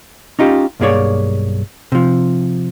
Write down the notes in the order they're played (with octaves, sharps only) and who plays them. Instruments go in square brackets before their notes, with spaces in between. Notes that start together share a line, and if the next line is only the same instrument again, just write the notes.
[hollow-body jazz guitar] C#4 D#4 F4 G4
B1 G2 A#3 G#4 C#5 D5
C3 F3